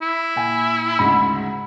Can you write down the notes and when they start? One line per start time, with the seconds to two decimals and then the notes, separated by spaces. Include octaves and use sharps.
0.02 E4
0.36 A#2 G5 G#5
0.99 D2 G#2 C#3 B5